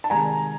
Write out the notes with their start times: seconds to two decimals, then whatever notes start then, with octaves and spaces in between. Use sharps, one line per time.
0.04 A5
0.10 C3 D#3 G#3 G#5 A#5